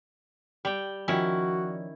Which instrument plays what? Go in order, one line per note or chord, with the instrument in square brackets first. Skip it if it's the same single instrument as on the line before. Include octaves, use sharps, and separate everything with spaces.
[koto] G3 G5
[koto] D#3 C#4 E4 [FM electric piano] F3 C#5 D5 [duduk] F#4